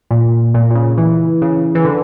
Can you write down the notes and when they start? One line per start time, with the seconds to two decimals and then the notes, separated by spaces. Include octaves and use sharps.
0.11 A#2
0.54 A#2
0.71 A#2
0.75 C#3
0.98 E3
1.42 C#3
1.75 E3
1.85 D3